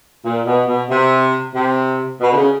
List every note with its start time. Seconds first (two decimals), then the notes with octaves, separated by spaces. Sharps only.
0.24 A#2
0.46 B2
0.67 B2
0.89 C3
1.54 C3
2.20 B2
2.32 D3
2.36 C#3